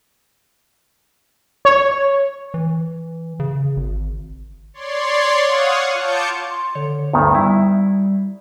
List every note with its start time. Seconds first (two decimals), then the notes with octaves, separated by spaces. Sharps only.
1.65 C#5
2.54 E3
3.40 C#3
3.77 G#1
4.74 C#5 D5 C6
5.45 C#5 F5 F#5 C#6 D#6
5.93 F4 A5 D6 G6 C#7
6.50 C6
6.75 D3 C#5
7.13 D2 G2 D#3 B3
7.35 G3 E4